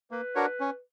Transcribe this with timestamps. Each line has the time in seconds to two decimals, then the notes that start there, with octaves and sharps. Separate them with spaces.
0.11 A#3 B4
0.35 D4 F#4 A#4 C#5
0.60 C#4